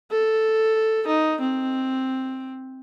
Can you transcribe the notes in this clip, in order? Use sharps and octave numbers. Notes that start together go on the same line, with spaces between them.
A4
D#4
C4